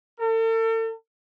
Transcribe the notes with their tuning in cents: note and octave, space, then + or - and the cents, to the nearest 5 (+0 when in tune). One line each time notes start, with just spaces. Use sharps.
A4 +40